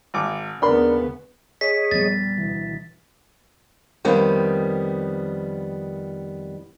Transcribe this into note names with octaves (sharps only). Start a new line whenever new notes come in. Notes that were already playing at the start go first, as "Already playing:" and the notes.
G#1 D6
D#2 C#3 B3 D4 A#4 B5 C6
G#4 C#5 D#5 B6
E2 A#2 F3 G3 B3 A6
D2 B2 E3
F2 D#3 G3 B3